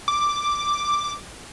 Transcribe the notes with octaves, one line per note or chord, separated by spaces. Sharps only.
D6